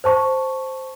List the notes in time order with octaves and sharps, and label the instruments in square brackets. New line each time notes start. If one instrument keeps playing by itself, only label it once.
[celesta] C5 A5 C#6